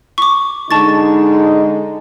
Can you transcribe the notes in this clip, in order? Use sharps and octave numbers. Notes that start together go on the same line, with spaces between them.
C#6 D6
D3 G#3 D#4 A5 C#6 A6